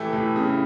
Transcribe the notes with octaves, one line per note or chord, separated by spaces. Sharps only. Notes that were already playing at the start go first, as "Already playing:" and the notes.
Already playing: A2 E3 A3 E4 G4
A2
C#3